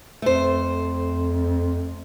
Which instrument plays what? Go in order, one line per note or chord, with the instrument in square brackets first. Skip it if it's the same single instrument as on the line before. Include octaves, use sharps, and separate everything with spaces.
[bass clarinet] F2 [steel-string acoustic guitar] A3 C5